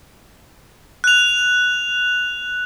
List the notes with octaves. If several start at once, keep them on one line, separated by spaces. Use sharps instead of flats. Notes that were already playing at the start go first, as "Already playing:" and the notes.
F#6 F7